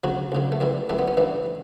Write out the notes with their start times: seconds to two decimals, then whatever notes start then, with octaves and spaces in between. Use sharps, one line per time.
0.04 D2 C#3 F#3 F#4
0.32 D2 C#3 F#3
0.52 A3
0.60 F#2 E3 G3
0.89 F#2 E3 G3 A3
0.99 B3
1.08 C#4
1.17 A1 G2 E3 G3